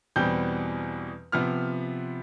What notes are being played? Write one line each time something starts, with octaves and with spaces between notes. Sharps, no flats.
E2 B2 G3 C4 G6
C3 F3 B3 F6